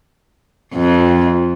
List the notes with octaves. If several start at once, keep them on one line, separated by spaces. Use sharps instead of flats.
F2